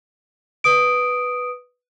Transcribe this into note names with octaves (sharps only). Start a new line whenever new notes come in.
B4 D#6 D7